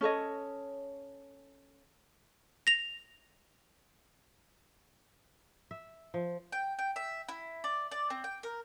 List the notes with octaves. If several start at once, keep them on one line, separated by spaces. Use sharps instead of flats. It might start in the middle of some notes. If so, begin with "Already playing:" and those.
C#4 A4 C#5 D#5
A#6 F7
E5
F3
G5
G5
E5
E4
D5
D5
C4
G5
A#4